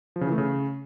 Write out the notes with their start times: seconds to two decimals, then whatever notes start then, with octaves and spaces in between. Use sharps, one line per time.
0.16 F3
0.21 C#3
0.27 E3
0.32 A3
0.38 C#3